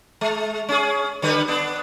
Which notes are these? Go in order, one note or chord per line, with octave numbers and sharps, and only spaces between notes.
G#3
C#4 G#4
D3 G3 B4
B3 D4